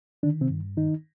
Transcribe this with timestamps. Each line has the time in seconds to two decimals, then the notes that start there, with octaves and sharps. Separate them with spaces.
0.23 D3 D#3 D4
0.41 C3 C4
0.50 G2
0.77 D#3 D#4